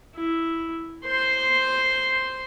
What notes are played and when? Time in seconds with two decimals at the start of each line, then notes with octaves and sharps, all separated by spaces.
0.15 E4
1.05 C5 C6